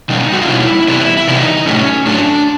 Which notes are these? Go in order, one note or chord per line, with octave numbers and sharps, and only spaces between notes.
B2 G3 A#3 C#4 D#4
F#4
F4
B2 G3 A#3 C#4 E4
C3 E3 G3 B3 E4
E4
C3 E3 G3 B3 D#4
A2 F#3 A3 C#4
A2 F#3 A3 D4